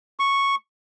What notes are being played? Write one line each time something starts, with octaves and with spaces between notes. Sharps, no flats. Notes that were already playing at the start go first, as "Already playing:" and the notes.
C#6